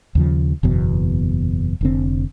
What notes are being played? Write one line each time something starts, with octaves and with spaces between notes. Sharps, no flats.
D#2 C#3 F3
F#1 E2 B2
F1 D3 C4